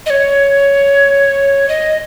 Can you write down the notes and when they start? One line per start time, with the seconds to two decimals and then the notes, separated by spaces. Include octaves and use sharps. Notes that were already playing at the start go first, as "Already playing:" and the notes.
0.06 D#5
0.10 C#5
1.69 D#5